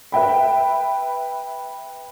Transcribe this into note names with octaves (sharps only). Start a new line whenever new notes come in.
B4 E5 G5 B5